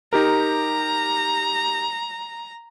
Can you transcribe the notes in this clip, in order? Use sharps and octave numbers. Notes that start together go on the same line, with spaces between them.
D#4 G4 A#4 A#5